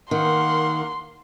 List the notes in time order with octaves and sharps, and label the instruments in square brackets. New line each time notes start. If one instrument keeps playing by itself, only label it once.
[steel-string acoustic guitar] D#3 [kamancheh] A#3 F#5 [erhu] C6